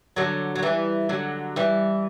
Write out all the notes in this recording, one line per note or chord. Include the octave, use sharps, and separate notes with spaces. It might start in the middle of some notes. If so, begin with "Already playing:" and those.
D3 F#3
F#3
E3 G3
D3 F#3
E3 G3